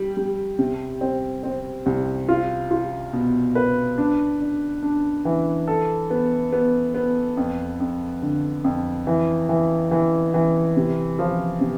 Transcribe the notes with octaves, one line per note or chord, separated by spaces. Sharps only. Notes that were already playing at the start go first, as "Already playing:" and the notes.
Already playing: G3
G3
C3
C4
C4
C2
F4
F4
B2
B4
D4
D4
D4
E3
A4
B3
B3
B3
F2
F2
D3
F2
E3
E3
E3
E3
C3
F3
C3